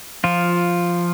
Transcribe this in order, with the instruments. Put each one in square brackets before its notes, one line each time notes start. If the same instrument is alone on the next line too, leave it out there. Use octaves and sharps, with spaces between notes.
[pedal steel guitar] F3 F4